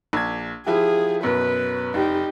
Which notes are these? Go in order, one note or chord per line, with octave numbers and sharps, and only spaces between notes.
A#1 G#6
F3 E4 G4 G#4
F#2 B2 B4
F1 D#4 G4